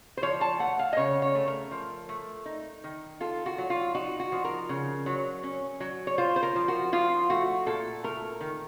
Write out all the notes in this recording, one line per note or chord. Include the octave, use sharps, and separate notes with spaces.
C5
F3 C#5
A5
A3 F#5
F5
D#5
C#3 C#5
C#5
A3
A#4
F3
A3
D#4
D#3
F4 A4
F#4
F#3
F4
D#4 F#4
F#4
F3
A#4
C#3
F#3
C#4
F#3
C#5
F4 C5
C5
A#4
F3
F#4
F3 F4
A3 F#4
A#2 A4
A3 A#4
D#3